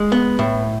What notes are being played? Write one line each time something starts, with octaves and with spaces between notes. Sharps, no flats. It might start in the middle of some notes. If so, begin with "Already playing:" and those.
Already playing: G#3
B3
A2